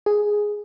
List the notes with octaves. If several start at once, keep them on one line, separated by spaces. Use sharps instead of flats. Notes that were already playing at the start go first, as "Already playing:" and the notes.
G#4